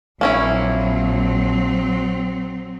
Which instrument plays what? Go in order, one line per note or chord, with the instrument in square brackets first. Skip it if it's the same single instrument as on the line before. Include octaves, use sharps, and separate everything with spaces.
[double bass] A#1 [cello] F#3 C4 [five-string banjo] A#3 C#4 E4